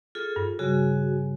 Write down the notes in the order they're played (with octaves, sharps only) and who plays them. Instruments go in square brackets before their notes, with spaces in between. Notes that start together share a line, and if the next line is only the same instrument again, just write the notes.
[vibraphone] F4 G#4 A4
[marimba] G2
[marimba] C#3 G3 [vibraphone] F#4 G#4 G#5